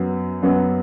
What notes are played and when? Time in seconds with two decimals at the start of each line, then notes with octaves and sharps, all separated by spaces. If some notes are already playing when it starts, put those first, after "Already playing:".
Already playing: F#2 F#3 B3
0.42 F#2 F#3 B3